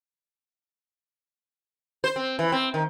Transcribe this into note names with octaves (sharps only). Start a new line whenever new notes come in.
C5
C4
E3
C4
D#3